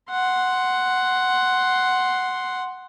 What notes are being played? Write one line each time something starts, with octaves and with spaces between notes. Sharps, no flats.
F#5 C6